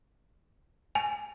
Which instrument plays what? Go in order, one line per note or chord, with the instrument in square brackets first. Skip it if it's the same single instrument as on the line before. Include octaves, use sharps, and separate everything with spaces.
[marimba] G#5